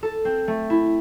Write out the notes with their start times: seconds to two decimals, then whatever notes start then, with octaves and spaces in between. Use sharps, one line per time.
0.03 A4
0.25 C4
0.48 A3
0.70 E4